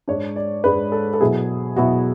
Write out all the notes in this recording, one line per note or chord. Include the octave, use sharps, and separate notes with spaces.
G#2 G#3 D4 C#5
D5
G#2 G#3 D4 B4
A4
A4
B2 F#3 B3 E4 G#4
B2 F#3 B3 E4 F#4